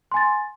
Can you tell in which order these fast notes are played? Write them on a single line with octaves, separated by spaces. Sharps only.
C6 G#5 A6